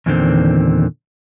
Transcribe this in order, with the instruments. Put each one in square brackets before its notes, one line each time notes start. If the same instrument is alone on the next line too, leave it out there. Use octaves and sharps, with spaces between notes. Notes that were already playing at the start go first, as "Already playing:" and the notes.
[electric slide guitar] E2 A#2 D3 D#3 C4